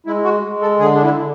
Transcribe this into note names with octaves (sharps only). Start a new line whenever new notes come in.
G#3 E4
F#4
G#3
A4
D3 G#4
D4
E4
D3